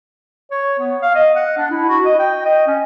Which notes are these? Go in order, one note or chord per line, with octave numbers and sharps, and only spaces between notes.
C#5
B3
F5
D#5
F#5
D4
E4
F#4
D#5
G5
D#5
C#4